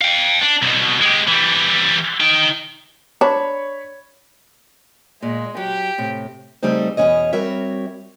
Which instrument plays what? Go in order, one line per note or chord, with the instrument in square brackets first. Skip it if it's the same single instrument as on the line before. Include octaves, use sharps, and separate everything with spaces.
[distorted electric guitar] F5 G5
D4
C2 B2
G#3 G4
E3 G3
D#4 G5
[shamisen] D4 [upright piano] C#5 B5
[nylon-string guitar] A#2 [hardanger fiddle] G#3
[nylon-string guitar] F#3 [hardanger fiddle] G4
[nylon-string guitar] A2 C3
[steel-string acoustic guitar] C#3 G3 A3 C4 D#4 C5
E2 B2 A3 C#4 C#5 D#5
G3 C4 F#4 A#4 C#5 E5